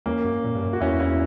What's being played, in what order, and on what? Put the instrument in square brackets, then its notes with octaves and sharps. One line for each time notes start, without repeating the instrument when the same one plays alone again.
[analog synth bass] E2 [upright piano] A#3 C#4
[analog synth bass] F#2
A#2
G2
F#2
[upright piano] F#4
[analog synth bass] E2 [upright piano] C#4 E4
[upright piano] C#4 E4